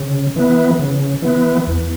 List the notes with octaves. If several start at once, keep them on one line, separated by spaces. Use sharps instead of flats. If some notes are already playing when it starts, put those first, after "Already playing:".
Already playing: C#3
E3 B3
C#3
E3 B3
E2